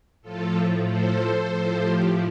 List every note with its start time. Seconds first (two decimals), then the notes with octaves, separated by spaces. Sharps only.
0.22 A2 F3 F4 A4
0.85 A4 C5
1.49 A2 F3
1.81 G4